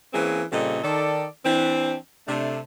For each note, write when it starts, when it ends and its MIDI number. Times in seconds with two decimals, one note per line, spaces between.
0.14 0.44 52
0.14 0.44 58
0.14 0.44 60
0.14 0.44 61
0.14 0.44 68
0.14 0.44 71
0.52 0.79 46
0.52 0.79 49
0.52 0.79 55
0.52 0.79 60
0.52 0.79 69
0.52 0.79 75
0.84 1.26 51
0.84 1.26 69
0.84 1.26 74
1.45 1.96 52
1.45 1.96 60
1.45 1.96 62
2.28 2.60 48
2.28 2.60 57
2.28 2.60 62